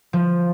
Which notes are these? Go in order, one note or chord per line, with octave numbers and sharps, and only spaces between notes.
F3